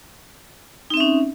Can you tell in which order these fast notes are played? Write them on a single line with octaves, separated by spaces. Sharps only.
D#4 C4 E5 C#4